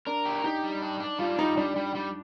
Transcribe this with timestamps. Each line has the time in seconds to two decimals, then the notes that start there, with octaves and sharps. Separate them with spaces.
0.07 D4 A#4
0.25 G4
0.44 D#4 G4
0.63 G3
0.82 D4
1.00 D4
1.19 G3 F4
1.39 G3 D#4
1.57 G3 D4
1.76 G3
1.95 G3